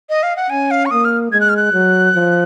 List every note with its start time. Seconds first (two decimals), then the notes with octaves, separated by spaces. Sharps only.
0.09 D#5
0.23 F5
0.36 F#5
0.50 C#4 G#5
0.71 F5
0.86 C#6
0.91 A#3 D#6
1.05 F6
1.32 G#3 G#6
1.41 F#6
1.49 F6
1.57 F#6
1.73 F#3
2.15 F3